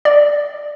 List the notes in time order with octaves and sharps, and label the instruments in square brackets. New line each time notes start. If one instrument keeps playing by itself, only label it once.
[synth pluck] D5